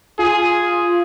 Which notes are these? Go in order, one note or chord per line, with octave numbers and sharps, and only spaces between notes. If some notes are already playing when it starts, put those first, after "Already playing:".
F4 G#4